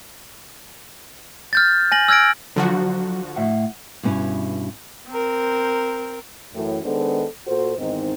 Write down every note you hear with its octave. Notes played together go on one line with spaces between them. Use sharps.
F6 G6 A6
G#5 A#6 F#7
E6 F6 G#6 A#6 D7
D3 F3 F#3 F#4
A2 E5 F#5
G2 B2 C4 C#4 E4 C#5
C4 A#4
F#2 A2 E3
D#3 G#3 B3 D4 A4 C5
A#2 F#4 A4 C5
E2 G#2 D#3 C4 D#4